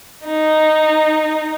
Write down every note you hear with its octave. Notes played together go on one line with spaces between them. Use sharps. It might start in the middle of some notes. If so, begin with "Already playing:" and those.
D#4